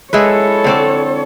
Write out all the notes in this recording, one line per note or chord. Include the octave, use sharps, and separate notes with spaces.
G#3 E4 A4 B4 C#5
D3 C4 D5